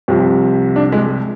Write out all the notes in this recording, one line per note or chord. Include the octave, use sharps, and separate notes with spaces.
C2 C3 F3
D4
G#3